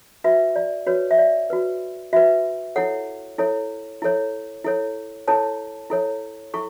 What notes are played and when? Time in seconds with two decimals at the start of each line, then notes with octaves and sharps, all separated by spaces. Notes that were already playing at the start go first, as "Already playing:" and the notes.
0.24 F#4 B4 E5
0.56 D5
0.86 F#4 B4 C#5
1.11 E5
1.18 D5
1.50 F#4 B4
2.13 F#4 B4 E5
2.76 E4 A4 C#5 F#5
3.38 E4 A4 C#5
4.02 E4 A4 C#5
4.64 E4 A4 C#5
5.28 E4 A4 C#5 A5
5.90 E4 A4 C#5
6.54 E4 A4 C#6